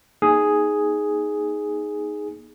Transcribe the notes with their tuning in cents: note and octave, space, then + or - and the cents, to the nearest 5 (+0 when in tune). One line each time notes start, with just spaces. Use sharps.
A#3 +40 D#4 +0 G#4 +0